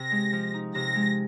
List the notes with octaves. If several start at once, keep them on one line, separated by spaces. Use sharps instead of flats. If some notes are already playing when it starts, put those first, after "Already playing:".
Already playing: C3 A#6
G#3
F3
D#4
C3 A#6
G#3